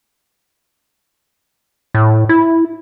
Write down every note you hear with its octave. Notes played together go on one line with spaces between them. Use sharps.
A2
E4